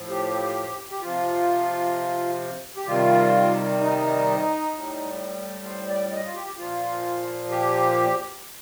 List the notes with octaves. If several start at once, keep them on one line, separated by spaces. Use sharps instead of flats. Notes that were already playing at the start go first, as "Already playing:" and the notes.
Already playing: A2 F3
G4
G4
C3 F3 F4
G4
C3 D#3 G3 F4
D#4
A2 G3
C5
D5
D#5
F4
G4
A#2 F3 F4
G4